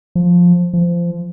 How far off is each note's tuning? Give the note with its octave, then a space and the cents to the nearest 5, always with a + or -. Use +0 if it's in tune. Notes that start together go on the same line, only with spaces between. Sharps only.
F3 +10
F3 -20